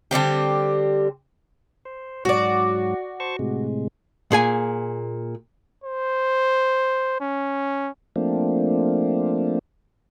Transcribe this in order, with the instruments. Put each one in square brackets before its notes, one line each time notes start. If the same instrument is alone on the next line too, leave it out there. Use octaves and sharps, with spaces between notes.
[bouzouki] D3 G3 C4 G4
[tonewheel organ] C5
[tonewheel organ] G#2 F#3 [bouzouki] F#4 D5
[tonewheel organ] C5 A5 C#6
A2 C3 G#3
[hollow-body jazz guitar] A#2 G#4 G#5
[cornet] C5
C#4
[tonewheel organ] F3 A3 A#3 C4 D4